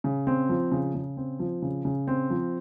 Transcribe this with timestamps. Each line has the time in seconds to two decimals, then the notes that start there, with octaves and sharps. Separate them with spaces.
0.04 C#3
0.27 C4
0.49 F3
0.72 C#3
0.95 C#3
1.17 C4
1.39 F3
1.62 C#3
1.85 C#3
2.08 C4
2.30 F3